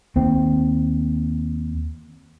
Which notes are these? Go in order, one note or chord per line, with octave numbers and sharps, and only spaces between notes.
D#2 C4